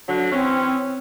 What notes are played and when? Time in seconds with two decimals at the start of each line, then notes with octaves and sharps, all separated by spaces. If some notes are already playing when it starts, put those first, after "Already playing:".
0.08 D3 F#3
0.32 E3 C4 C#4